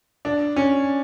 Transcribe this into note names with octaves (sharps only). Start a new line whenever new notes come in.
D4
C#4